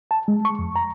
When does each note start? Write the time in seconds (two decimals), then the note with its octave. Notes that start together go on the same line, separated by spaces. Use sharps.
0.11 A5
0.28 G#3
0.45 C#6
0.59 F2
0.76 A#5